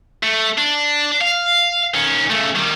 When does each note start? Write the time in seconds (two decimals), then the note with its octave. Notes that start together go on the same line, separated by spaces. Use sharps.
0.23 A3
0.58 D4
1.21 F5
1.94 D#3 C#4
2.31 C#3 A3
2.56 D#3 G3